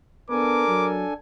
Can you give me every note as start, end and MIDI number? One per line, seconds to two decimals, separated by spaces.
0.30 0.67 59
0.30 1.13 62
0.30 1.13 69
0.30 0.97 70
0.30 1.13 80
0.30 0.89 86
0.68 1.05 54